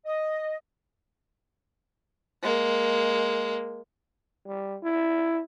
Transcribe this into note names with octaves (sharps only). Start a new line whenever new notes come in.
D#5
G#3 A#3
G3
E4